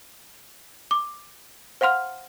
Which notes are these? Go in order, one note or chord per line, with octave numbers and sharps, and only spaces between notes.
D6
C5 F5 F#5 C6 F6